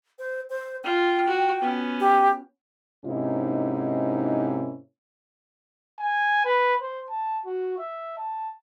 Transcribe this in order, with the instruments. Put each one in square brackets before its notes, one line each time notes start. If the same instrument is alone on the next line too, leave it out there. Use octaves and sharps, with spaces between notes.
[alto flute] C5
C5
[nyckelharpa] F4 [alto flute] G5
[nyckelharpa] F#4
B3 C#4
[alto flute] G4
[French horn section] G#2 C3 A#3 C#4 D#4 E4
[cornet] G#5
B4
C5
A5
F#4
E5
A5